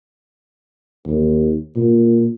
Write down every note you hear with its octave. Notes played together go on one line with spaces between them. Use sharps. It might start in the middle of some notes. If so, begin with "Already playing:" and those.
D#2
A#2